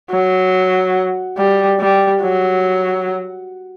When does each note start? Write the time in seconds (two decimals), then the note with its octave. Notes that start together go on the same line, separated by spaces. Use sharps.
0.11 F#3
1.38 G3
1.80 G3
2.23 F#3